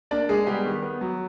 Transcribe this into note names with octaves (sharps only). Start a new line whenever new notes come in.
A#3 D4 D5
G#3 G#4
G3 B3 G4
D#3
B3
F#3